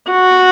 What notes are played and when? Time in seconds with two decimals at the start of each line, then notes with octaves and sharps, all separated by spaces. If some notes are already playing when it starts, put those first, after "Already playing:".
0.11 F#4